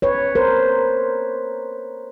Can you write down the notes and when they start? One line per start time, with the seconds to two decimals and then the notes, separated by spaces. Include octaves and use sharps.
0.02 B4 C#5
0.35 A#4 C5